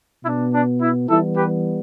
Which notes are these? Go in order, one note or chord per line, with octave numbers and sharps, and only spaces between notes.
B2 B3 D4 E4
D4
E4
E3 G3 B3 E4 A4
G4 B4